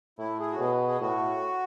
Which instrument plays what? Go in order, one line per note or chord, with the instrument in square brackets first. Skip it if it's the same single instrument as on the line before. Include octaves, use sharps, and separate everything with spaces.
[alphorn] A2 [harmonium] E4
[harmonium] G#4
F#4
[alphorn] B2 [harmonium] G#4
[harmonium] G#4
[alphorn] A2 [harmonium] F#4